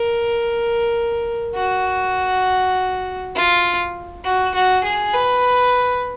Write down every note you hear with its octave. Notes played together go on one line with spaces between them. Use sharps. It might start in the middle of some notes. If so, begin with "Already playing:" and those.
Already playing: A#4
F#4
F4
F#4
F#4
G#4
B4